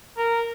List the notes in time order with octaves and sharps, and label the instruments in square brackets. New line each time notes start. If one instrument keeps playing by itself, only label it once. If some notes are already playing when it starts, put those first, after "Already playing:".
[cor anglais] A#4